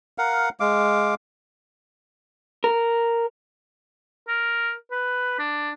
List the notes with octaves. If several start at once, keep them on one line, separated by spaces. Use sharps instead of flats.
A#4 F5 F#5
G#3 F5 D6
A#4
A#4
B4
D4